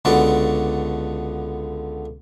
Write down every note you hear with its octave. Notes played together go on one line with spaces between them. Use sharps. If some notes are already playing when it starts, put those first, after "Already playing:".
C#2 D3 B3 F#4 D5